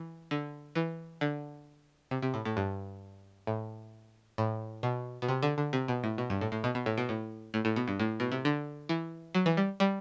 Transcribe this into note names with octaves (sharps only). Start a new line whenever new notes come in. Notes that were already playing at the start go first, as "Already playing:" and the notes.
Already playing: E3
D3
E3
D3
C3
C3
A2
A2
G2
A2
A2
B2
B2
C3
D3
D3
C3
B2
A2
B2
G2
A2
A2
B2
B2
A2
B2
A2
A2
A2
B2
G2
A2
B2
C3
D3
E3
F#3
E3
G3
G3